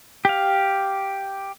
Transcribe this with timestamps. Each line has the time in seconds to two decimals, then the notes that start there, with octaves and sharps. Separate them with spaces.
0.25 G4 F5